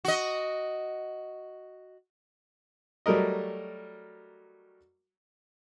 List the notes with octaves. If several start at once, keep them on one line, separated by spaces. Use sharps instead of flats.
F#4 D#5
F#3 G3 A3 A#4 D#5